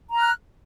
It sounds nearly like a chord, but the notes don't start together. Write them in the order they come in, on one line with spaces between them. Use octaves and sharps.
A#5 F6 F#6